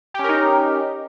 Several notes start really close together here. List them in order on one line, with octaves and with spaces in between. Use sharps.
G4 C#4 A#4 D#4